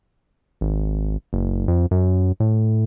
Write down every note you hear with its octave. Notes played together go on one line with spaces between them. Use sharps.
G#1
F#1
F2
F#2
A2